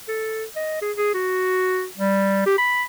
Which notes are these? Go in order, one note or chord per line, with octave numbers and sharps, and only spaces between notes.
A4
D#5
G#4
G#4
F#4
G3
G4
B5